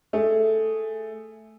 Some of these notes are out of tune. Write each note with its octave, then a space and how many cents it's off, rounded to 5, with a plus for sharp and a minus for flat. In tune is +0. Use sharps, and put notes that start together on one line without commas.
A3 +0 G#4 +0